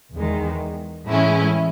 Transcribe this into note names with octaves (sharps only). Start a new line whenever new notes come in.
E2 D#3 G#3
A2 E3 G#3 C#4 E4